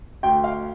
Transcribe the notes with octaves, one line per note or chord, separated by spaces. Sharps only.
D2 G5
F5